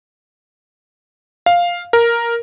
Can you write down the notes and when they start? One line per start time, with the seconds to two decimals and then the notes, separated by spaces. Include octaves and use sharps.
1.46 F5
1.93 A#4